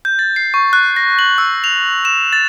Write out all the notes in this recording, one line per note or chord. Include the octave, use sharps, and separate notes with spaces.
G6
A6
C7
C#6
F#6
A#6
F#7
E6
F7
E7
A6